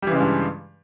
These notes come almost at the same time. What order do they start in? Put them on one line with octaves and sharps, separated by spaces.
G3 E3 C#3 G#3 G2